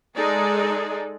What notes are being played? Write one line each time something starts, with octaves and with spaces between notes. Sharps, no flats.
G#3 D#4 G#4 A4 D5